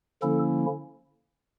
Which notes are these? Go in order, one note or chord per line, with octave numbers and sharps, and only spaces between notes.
D3 F3 A#3 C#4 E4 A4